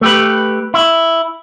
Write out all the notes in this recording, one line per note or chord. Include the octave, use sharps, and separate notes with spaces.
A3 G4 B4
E4